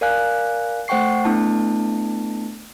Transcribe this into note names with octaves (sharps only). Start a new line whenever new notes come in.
A#4 D5 F5 G#5 F#6
A3 C5 F#5 G5 C#6 C7
A3 B3 D4 E4 A5